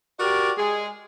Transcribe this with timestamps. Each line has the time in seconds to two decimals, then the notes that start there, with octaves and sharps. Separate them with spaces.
0.19 F#4 G4 A#4 D5
0.57 G#3 G#4